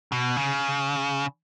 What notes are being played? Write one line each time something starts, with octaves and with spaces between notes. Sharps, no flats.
B2
C#3